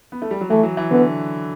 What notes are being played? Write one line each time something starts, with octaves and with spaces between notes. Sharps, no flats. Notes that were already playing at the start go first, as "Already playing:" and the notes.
B3
A3
G3
F#3
E3 A3
F#3
E3
D3 B3